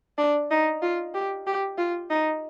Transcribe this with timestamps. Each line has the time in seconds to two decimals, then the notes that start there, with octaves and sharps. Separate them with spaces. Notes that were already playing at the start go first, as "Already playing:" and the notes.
0.18 D4
0.51 D#4
0.82 F4
1.14 G4
1.47 G4
1.78 F4
2.10 D#4